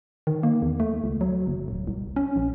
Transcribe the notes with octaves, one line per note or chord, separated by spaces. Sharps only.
D#3
A#3
E2
A3
C#2
F#3
F#1
D#1
C2
C#4
A#1